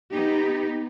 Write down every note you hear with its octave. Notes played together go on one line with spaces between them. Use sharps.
B3 D#4 G4